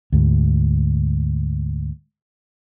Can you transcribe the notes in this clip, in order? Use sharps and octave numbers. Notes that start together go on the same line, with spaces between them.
D2 G#2